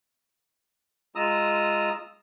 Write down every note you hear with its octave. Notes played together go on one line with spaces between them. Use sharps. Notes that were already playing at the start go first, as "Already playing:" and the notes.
G#3 F4 A#5 D#6 E6